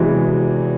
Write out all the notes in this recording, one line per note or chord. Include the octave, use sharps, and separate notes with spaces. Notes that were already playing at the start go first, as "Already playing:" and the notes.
Already playing: E2 C3 E3 F#3 G#3 F#4